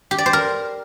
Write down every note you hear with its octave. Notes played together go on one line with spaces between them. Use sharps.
G4
D5
C5
A#4